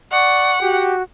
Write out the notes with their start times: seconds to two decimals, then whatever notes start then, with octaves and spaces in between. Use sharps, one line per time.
0.12 D5 F#5 C#6
0.61 F#4 G4